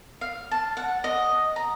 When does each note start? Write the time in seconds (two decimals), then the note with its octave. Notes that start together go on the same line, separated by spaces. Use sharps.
0.21 F5
0.51 A5
0.77 F#5
1.04 D#5
1.56 A#5